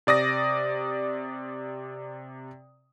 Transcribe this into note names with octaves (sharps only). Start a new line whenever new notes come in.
C3 D5 D#6 A#6